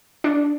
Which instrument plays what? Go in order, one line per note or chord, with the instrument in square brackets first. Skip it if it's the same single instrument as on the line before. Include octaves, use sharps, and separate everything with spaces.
[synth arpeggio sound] D4